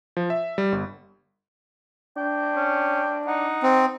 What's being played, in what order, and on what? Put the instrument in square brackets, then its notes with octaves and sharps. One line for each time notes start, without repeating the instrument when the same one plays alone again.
[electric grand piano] F3
E5
G3
G1
[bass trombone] D4 [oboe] G5
[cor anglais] C#4
[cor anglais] D#4 [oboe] F#5
[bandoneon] C4